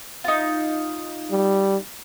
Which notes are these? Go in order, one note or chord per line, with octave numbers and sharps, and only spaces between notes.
D#4 F4
G3